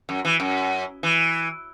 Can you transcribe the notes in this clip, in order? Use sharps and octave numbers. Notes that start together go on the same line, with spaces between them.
F#2
E3
F#2
E3